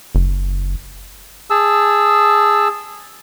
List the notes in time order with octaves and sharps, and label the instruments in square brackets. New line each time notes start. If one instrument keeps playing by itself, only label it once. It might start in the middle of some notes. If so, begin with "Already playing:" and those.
[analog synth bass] F#1
[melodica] G#4 A5 E6